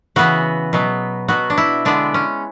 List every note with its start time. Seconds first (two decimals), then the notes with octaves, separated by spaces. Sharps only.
0.16 C#3 E3 B3 F#4
0.73 B2 F#3 B3
1.28 B2 F#3 B3 F#4
1.50 D4
1.58 E4
1.85 D3 G#3 B3 D4
2.14 C#4